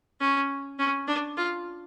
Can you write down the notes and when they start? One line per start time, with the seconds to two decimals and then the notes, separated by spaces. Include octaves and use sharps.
0.20 C#4
0.79 C#4
1.08 D4
1.37 F4